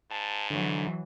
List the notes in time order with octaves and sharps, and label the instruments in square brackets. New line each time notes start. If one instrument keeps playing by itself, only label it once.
[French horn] G#2 [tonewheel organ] A5
[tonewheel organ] D3 [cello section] E3 F#3